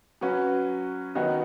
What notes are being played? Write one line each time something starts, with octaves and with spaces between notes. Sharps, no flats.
F#3 C#4 F#4 B4
D#3 F#3 B3 D#4 F#4